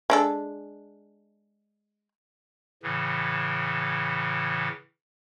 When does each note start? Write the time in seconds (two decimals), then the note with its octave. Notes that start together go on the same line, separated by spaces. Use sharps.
0.10 G#3 D4 A4
2.83 A2 C#3 E3